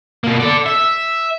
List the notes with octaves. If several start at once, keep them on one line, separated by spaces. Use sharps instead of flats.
B2 A#3
A4 D5
E5